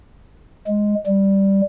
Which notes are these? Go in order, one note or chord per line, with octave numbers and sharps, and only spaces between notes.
G#3
G3